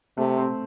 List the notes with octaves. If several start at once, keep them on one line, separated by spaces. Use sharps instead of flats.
C3 A3
C4